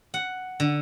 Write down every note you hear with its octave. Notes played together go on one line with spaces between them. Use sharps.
F#5
D3